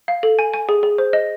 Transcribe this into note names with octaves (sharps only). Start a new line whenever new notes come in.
F5
A4
G#5
G#5
G#4
G#4
C5
D#5